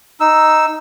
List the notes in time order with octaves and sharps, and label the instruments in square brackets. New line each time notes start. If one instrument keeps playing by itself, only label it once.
[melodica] D#4 E6